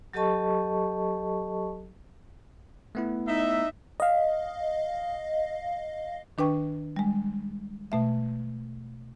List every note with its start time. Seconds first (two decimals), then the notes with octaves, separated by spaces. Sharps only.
0.13 F#3 G4 A4 D#5 A5 C#6
2.95 A3 B3 E4
3.27 D#4 E5
4.00 D#5 F5
6.38 D#3 D4 B4 G5 C#6
6.96 G3 G#3
7.92 B2 A3 E5